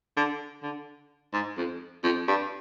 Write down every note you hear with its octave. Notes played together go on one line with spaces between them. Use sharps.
D3
D3
G#2
F2
F2
G2